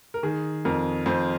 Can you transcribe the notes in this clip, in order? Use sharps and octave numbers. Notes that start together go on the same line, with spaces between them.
A#4
D#3 G#4
F2 A#4
F2 C5